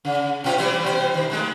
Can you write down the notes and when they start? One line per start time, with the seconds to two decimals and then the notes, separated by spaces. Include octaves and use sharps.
0.05 C#3
0.44 B2 C#4 F4
0.58 E3 G3 C4
0.84 B2 C5
1.14 D#3
1.30 C#3 G#3 A3